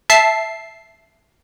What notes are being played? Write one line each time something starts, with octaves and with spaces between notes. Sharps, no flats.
E5 A5 C7